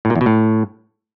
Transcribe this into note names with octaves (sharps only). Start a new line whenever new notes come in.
A2
A#2
E2
B2
A2